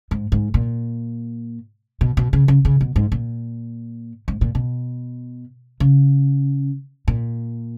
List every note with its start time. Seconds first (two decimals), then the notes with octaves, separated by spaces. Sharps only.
0.11 G#2
0.32 G#2
0.54 A#2
2.01 B2
2.17 B2
2.33 C#3
2.48 C#3
2.65 C#3
2.81 B2
2.96 G#2
3.12 A#2
4.28 G#2
4.41 A#2
4.55 B2
5.80 C#3
7.08 A#2